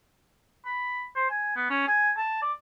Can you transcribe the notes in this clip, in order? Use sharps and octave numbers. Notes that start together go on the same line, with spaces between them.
B5
C5
G#5
B3
C#4
G#5
A5
D5